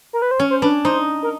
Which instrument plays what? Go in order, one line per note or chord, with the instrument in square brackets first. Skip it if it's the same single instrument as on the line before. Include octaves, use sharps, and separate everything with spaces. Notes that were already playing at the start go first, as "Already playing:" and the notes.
[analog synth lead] A#4
B4
C5
[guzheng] C#4 [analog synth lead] C#5
[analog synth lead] C5
[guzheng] D4 [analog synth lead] B4
[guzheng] D#4 [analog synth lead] C5
[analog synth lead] A#4